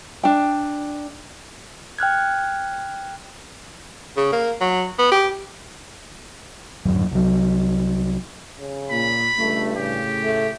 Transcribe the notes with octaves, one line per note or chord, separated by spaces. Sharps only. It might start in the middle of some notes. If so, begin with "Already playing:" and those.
D4 G5
G5 F6 F#6 G#6
C#3
A#3
F#3
B3
G4
D1 G#1 F#2
C2 F#3
C#3
A#2 B5
C#2 G2 A3
A2 C#3 G4
A3